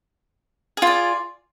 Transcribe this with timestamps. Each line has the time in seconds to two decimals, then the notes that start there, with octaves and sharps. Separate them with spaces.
0.77 G#4
0.82 F4
0.87 D5